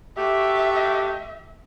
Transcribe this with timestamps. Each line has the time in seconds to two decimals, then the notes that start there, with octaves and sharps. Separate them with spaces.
0.17 A3 F#4 G4 E5